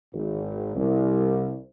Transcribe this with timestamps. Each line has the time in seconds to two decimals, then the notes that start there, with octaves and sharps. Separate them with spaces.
0.14 G#1
0.76 C2